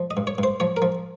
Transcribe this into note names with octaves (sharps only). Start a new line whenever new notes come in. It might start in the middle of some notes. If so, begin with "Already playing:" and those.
Already playing: F3
D#5
G2
C#5
G2 C5
F3 C#5
A#4
F3